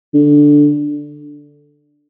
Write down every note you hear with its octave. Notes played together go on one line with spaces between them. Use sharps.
D3